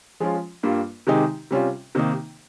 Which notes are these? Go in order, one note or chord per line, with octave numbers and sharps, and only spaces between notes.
F3 G#3 C#4 F4
G2 G3 A#3 F4
C3 D#3 G#3 D#4 G4
C3 G3 C#4 F4
C3 D#3 A#3 D#4